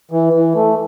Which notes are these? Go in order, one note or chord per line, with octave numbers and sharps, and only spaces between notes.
E3
E3
A3